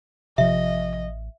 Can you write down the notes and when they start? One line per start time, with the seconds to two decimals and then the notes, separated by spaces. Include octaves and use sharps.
0.38 A1 C3 F3 D#5 E5